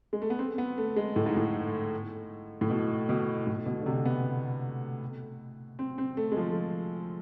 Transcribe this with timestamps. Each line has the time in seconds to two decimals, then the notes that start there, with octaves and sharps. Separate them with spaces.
0.13 G#3
0.22 A3
0.30 B3
0.39 C4
0.58 B3
0.78 A3
0.96 G#3
1.16 A2
1.26 G#2
1.37 A2
2.61 A2
2.70 B2
3.09 B2
3.47 A2
3.66 B2
3.82 D3
3.86 C3
4.05 B3
5.79 C4
5.98 C4
6.17 A3
6.32 G#3
6.37 F3